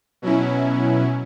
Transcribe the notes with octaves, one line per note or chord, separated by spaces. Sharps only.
B2 F#3 C#4 E4